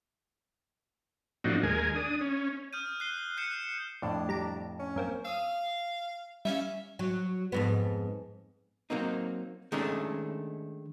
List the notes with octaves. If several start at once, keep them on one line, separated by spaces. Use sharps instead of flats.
A2 F3 C4 D4 D#4 F#4
D#2 G#3 A#4 G#5
D4 D#6
C#4
D#6 F6 G6 D#7
F#6 C7 G7
F#6 G6 C7 C#7 E7
F2 A2 D4
G3 A#5 D7
C#4
F#2 A#3 C4
F5 D#6 E6
G3 C#4 E5 F5
F#3
F2 G#2 B3
F#3 A#3 C4 D#4
D#3 G#3 A3 C#4 D4